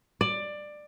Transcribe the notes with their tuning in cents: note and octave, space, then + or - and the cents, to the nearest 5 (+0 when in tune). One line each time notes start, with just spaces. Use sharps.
D5 +15